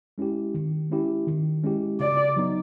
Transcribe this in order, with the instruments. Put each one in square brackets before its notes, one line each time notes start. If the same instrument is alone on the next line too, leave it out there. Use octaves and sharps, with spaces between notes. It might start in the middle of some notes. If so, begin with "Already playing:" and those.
[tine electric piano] G#3 C#4 E4 G4
D#3
G#3 C#4 E4 G4
D#3
G#3 C#4 E4 G4
[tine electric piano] C#3 [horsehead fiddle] D5
[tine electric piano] F#3 B3 D#4